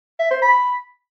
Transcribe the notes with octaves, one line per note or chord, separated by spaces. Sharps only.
E5
C5
B5